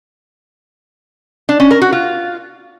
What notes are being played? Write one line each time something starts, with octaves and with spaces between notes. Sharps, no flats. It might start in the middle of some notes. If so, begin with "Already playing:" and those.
D4
C#4
A#4
F#4
F4